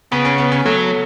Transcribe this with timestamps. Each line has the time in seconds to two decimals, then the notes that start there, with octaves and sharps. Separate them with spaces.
0.12 C#3 B3
0.25 C#4
0.38 B3
0.52 C#4
0.65 F#3 A3